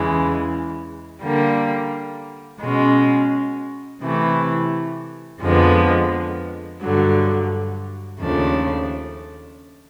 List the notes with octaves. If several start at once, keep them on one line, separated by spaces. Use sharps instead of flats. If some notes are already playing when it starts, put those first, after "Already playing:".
Already playing: E2 C#3 E3 G#3
D3 G3 A#3
B2 G#3 C#4
C3 E3 A3
F2 D3 F3 G#3 B3
G2 D3 F#3
D#2 C#3 F3 A3 D4